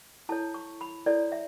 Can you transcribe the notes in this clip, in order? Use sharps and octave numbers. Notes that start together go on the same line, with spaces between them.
E4 A4 C#5 A5
C#6
B5
E4 A4 C#5 D5
E5